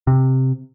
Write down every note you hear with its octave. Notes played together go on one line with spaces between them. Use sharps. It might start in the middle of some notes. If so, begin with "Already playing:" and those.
C3